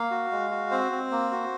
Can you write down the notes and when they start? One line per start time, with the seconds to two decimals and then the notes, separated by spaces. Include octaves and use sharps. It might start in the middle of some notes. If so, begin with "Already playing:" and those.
Already playing: A#3 F5
0.11 F#4
0.32 G#3
0.51 F#4
0.71 C4 C5
0.92 C4
1.11 A#3
1.31 F#4